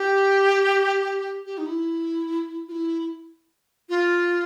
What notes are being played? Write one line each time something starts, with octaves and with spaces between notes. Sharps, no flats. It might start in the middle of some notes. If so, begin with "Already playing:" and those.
Already playing: G4
G4
D#4
E4
F4
E4
F4